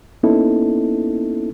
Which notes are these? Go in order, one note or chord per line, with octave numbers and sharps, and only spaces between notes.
A#3 B3 C#4 D#4 E4 A4